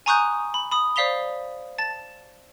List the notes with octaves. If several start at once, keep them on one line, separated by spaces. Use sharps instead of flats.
G#5 A#5 C#6 D#6 F#6 G6
B5
B5 D#6
C5 D5 F5 B6 F7 G7
A5 A6